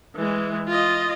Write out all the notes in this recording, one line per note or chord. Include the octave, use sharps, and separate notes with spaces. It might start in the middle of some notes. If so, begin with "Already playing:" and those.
E3 G#3
F4 D#5